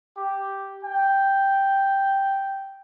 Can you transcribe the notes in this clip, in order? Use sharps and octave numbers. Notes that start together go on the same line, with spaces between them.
G4
G5